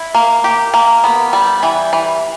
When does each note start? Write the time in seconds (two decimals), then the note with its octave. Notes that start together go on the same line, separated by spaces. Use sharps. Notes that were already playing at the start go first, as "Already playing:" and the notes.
Already playing: E4
0.15 A#3
0.44 G4
0.74 A#3
1.04 B3
1.33 G3
1.63 E3
1.93 E3